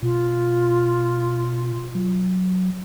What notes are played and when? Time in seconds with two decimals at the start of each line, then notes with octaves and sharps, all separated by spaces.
0.02 B2 F4
1.95 F#3